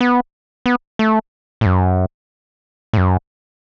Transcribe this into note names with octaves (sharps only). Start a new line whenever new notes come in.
B3
B3
A3
A2
F#2
A2
F#2